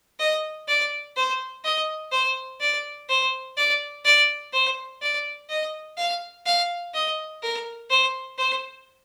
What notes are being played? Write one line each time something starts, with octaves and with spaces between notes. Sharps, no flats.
D#5
D5
C5
D#5
C5
D5
C5
D5
D5
C5
D5
D#5
F5
F5
D#5
A#4
C5
C5